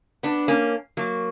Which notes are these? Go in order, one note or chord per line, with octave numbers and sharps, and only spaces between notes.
B3 D4
A#3 C#4
F#3 A#3